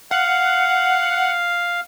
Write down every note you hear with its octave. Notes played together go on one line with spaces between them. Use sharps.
F5 F#5